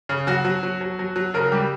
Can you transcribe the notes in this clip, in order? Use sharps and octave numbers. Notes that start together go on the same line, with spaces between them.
C#3
F#3 F#4
F#3
F#3
F#3
F#3
F#3
C#3 A#4
G3 G4